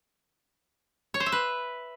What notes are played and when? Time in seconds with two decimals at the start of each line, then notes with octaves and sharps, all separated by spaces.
1.14 C#5
1.20 C5
1.26 E5
1.32 B4